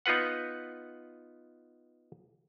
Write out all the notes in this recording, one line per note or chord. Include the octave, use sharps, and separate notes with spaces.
B3 D#4 F4 B4 F#5